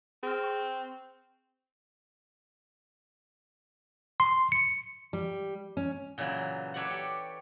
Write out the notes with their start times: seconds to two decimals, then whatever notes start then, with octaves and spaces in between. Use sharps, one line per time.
0.23 C4 G#4 F6
0.44 C#6
4.20 C6
4.52 C#7
5.13 G3
5.77 C#4
6.18 A#2 C#3 E3 F#3
6.74 A4 B4 C#5 D5 E5 F#5
6.90 G4